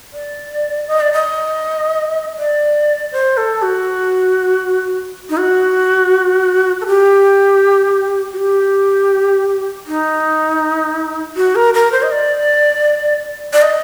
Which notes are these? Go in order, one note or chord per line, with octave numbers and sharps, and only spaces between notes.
D5
D#5
D5
D#5
D5
C5
A4
F#4
D#4
F#4
A4
G4
F#4
G4
D#4
F#4
A#4
A#4
C5
D#5
D5
D5
D#5